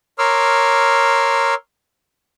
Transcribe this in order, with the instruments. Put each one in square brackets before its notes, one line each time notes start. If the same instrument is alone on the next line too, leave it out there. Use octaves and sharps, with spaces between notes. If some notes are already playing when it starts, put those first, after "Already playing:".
[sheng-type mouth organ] A#4 C#5 C6 D6 E6 F6